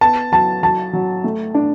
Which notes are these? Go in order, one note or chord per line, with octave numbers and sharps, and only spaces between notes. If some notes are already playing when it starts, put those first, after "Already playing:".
B3 A5
F#3 A5
F#3 A5
F#3
A3
D4